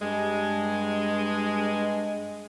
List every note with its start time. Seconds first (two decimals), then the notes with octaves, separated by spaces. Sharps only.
0.02 G2 G#3